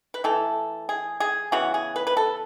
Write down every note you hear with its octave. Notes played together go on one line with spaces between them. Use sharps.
B4
E3 A3 A4
G#4
G#4
C#3 E3 B3 F#4
G#4
B4
B4
A4